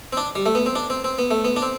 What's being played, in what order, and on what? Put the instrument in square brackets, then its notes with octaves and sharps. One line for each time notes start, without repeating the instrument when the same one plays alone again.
[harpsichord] C4
D4
G3
A3
B3
C4
D4
C4
C4
B3
A3
B3
D4
C4